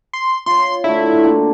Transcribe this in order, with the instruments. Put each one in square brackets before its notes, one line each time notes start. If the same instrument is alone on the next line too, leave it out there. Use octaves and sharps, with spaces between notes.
[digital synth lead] C6
[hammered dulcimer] F4 C#5 [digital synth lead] C6
[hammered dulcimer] D3 A3 [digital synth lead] E4
[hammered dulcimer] A#3 D4 F#4